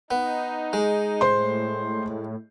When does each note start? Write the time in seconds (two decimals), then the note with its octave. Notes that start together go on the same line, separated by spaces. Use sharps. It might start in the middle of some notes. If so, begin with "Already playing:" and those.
0.11 B3 D#4
0.73 G#3
1.21 A2 C5 C6